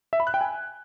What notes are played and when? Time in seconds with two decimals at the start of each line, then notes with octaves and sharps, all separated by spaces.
0.13 E5
0.20 B5
0.27 F#6
0.34 G5
0.41 G#5